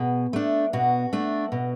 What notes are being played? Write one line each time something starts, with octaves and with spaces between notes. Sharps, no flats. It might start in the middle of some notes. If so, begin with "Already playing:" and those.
Already playing: B2 G#4
A3 D4
B2 F#4
A3 D4
B2